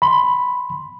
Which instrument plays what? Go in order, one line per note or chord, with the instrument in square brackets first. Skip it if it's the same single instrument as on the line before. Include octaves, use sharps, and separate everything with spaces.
[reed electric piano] B5 C6